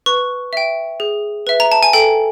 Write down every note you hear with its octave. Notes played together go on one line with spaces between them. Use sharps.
B4 C#6
E5 G5
G#4
B4 E5
A#5
A5
G#5
A4 G5